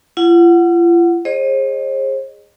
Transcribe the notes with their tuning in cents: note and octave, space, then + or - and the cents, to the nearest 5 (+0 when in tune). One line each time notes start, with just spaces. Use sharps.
F4 -40 F#5 +0
G#4 -10 C5 +40 D#5 -30